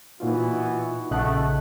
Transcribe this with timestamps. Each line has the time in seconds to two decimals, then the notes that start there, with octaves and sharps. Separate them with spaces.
0.20 A#2 E3 B3 D#4 F4 F#4
1.11 A#1 C#3 A3 D#5 F#5 A5 F#6